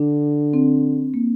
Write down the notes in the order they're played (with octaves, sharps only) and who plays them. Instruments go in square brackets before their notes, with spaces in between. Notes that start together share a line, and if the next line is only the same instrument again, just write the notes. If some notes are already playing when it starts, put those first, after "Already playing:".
Already playing: [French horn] D3 [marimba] D4
[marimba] C4
A#3